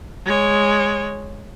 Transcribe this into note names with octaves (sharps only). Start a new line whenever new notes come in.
G#3 C#5